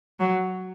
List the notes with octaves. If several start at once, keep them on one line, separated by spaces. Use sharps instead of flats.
F#3